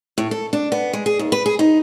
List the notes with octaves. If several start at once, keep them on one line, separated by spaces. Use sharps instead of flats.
A2
A4
D4
B3
G#3
G#4
D#2
B4
G#4
D#4